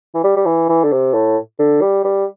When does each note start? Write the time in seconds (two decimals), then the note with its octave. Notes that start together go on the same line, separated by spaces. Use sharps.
0.14 E3
0.24 G3
0.36 G3
0.46 E3
0.69 E3
0.84 D3
0.92 C3
1.14 A2
1.59 D3
1.81 G3
2.04 G3